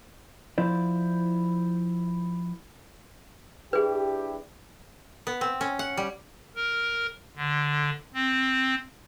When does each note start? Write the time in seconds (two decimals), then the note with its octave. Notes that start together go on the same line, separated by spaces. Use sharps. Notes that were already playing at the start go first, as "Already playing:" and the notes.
0.58 F3 E4 C5 D5
3.73 D4 E4 G4 G#4 B4
5.27 B3
5.41 C4
5.61 C#4
5.79 F#5
5.97 G3
6.56 A#4
7.37 D3
8.14 C4